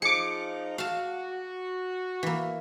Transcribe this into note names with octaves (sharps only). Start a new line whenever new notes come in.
F3 D#4 G#4 D6 C#7
F#4 F5 A5
E3 A#3